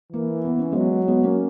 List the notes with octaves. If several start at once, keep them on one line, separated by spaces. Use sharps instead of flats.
E3 A#3
B3
C#4
F#3 G#3 B3
G#3 B3
A#3 C#4